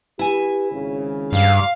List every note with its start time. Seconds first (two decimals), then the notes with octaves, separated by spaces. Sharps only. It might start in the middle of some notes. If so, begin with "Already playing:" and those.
0.19 E4 G4 B4 G#5
0.72 G#1 C#3
1.32 G2 F5